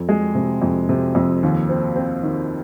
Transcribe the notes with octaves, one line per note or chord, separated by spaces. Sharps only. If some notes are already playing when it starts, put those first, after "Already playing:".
Already playing: F2
G#3
C3
F2
C3
F2
D#2
C4
C4
D#3